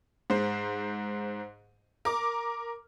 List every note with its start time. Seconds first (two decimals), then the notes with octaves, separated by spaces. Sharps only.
0.30 G#2 C5
2.05 A#4 D6